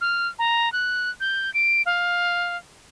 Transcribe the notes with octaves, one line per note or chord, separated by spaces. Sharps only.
F6
A#5
F#6
G6
D7
F5